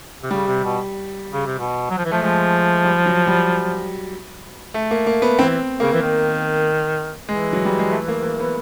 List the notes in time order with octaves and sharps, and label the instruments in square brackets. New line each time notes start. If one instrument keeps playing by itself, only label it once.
[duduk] C3
[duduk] C#3 [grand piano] G3
[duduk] C3
B2
C#3
C3
B2
F#3
F3
E3
[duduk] F3 [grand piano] A3
[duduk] F3 [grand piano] G#3
[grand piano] G3
F#3
G3
A3
A#3
A#3
B3
[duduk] E3 [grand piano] C4
[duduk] C#3 [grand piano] A#3
[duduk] E3
D#3
[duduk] E3 [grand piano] G#3
[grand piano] F#3
G3
G#3
A3
A#3
A#3
B3